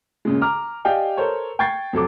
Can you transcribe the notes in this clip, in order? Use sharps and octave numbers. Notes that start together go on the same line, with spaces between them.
A#2 C#3 G#3
A#5 D6 F6
G4 D5 D#5 F5 G5 G#5
A4 A#4 C5 C#5
G5 C#6 G#6 A6 C7
F2 F#3 A4 D6